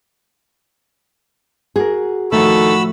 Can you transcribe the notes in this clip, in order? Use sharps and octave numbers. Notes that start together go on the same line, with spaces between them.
F#4 G#4 A#4
A2 D#3 F3 F#4 A4 B5 E6